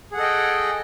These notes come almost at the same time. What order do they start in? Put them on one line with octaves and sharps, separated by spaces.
G#4 F#5 A4 D#5 G5